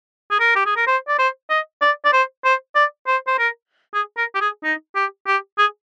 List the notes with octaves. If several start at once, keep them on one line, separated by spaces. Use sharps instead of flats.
G#4
A#4
G4
G#4
A#4
C5
D5
C5
D#5
D5
D5
C5
C5
D5
C5
C5
A#4
G#4
A#4
G4
G#4
D#4
G4
G4
G#4